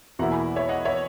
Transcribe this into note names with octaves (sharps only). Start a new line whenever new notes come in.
E2 B2 A#3 E4 F#5 A#5
G#5 B5
C#5 E5
D#5 F#5
C#5 E5